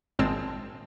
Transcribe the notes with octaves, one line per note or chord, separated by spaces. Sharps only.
G#1 A#2 G#3 C4 A5 E6